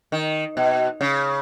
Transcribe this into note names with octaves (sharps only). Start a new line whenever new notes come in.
D#3
B2
C#3